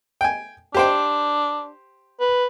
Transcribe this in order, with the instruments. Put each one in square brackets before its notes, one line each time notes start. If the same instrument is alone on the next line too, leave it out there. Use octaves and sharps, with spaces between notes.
[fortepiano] G5 G#5
[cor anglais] D4 [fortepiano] G4 C5 G5
[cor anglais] B4